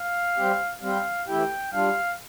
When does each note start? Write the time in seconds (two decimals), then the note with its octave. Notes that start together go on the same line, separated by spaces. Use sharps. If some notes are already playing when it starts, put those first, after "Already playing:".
Already playing: F5
0.36 G3 C4 G4
0.81 G3 C4 G4 F5
1.27 E3 A3 E4 G4 G5
1.72 G3 D4 F4 F5